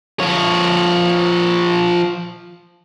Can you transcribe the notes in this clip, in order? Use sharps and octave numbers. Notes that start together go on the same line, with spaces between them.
F3 C#5